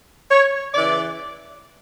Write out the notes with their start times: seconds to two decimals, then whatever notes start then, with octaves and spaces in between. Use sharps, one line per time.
0.30 C#5
0.74 C#3 E3 D5